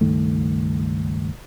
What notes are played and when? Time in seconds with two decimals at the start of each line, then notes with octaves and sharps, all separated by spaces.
0.01 C#2 G2 D#3 A3